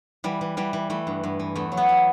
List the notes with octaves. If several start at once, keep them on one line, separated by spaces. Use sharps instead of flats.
E3 G3
E3
E3 G3
E3
E3 A3
G2
G2
E3
E2 A3
F#3
B3
F#3